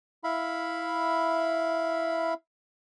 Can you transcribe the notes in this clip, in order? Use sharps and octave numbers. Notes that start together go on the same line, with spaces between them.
E4 E5 F5 B5